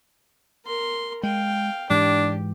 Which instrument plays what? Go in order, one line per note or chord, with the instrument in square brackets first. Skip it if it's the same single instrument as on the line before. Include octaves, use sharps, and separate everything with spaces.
[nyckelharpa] A#4 C6
[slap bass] G#3 [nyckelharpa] F5 G5
[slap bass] G#2 E3 [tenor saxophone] D4 [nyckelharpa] G4